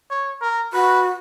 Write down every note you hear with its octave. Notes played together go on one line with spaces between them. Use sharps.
C#5
A#4
F#4 B4